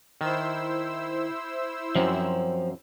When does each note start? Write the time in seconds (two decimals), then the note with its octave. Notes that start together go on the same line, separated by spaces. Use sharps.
0.21 D#3 E4 C5 E6
1.96 F#2 F3 C4